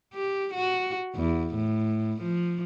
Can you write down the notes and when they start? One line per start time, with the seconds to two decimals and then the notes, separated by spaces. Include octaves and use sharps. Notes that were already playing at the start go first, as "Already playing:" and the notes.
0.14 G4
0.54 F#4
1.15 E2
1.54 A2
2.22 F3